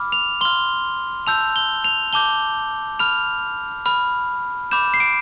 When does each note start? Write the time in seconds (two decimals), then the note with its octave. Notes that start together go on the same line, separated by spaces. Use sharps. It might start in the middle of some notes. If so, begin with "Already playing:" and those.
Already playing: B5 D6 F6
0.12 F7
0.41 C6 F6 G7
1.27 A5 E6 G6 F7
1.56 G7
1.84 F7
2.13 A5 D6 G6 G7
2.99 B5 F6 F7
3.86 B5 F6
4.71 B5 D6 G6 E7
4.94 C7
5.00 D7